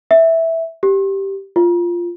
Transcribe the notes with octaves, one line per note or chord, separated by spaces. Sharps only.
E5
G4
F4